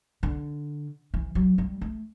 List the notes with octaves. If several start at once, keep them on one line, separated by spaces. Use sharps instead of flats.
D3
E3
F#3
G3
A3